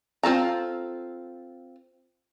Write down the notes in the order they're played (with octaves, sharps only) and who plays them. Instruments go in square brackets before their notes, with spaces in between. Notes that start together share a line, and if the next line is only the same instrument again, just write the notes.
[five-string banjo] C4 F4 A4 A#5